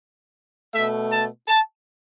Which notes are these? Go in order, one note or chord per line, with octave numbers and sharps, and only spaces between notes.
B2 A3 E5
A5
A5